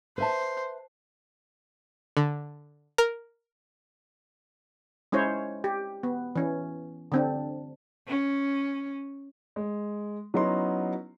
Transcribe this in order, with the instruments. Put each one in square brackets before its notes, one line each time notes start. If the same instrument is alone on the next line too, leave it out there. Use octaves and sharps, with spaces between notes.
[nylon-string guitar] B4 E5 A5 [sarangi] C5
[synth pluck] D3
A#4
[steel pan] G#3 C#4 E4 C5 C#5
G4
B3
E3 C#4
D3 C4 D4
[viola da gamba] C#4
[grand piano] G#3
F#3 B3 C#4 D#4 E4 C6